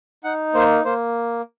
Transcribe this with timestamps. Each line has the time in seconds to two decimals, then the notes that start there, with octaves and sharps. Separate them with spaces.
0.24 D#4 F#5
0.54 A#3 C5
0.85 A#3 C5